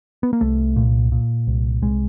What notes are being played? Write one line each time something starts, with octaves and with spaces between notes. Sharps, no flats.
B3
A#3
C2 A3
A#2
A#2
C2
C2 G#3